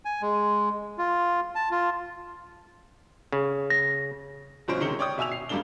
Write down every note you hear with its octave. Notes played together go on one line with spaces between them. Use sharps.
G#5
G#3
F4
A5
F4
C#3
A#6
G1 B2 F3 C#4 C5 D7
C3 D#3 G#3 C#4 C#7 G7
C#5 D5 G5 D6 D#6
B2 E5 G#5 E6 F7
C7
F#2 C#3 G3 A#3 D4 G7